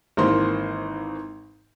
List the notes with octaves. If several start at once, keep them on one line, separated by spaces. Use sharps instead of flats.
G#1 E3 A#3 C5 C6